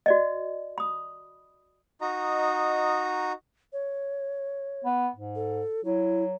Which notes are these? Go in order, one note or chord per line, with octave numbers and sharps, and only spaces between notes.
F#4 D5 D#5
B5 D#6
D#4 F#4 D#5 A#5
C#5
B3
G#2
A4
F#3 E4